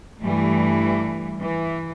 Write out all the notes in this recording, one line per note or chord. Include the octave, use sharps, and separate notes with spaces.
G2 E3 G3 A3
E3